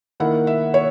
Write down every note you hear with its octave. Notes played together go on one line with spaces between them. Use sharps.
D#3 A#3 E4 F#5
E5
C#5